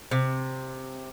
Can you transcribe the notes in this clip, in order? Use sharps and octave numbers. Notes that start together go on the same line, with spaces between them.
C3